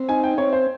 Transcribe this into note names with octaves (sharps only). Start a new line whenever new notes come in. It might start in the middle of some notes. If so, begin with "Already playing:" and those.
Already playing: C4
D#4 G#5
G5
C4 C#5
C5